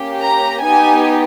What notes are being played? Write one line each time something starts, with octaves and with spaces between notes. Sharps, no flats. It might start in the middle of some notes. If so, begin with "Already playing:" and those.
Already playing: A#3 C#4 G4
A#5
B3 D#4 G4 G#5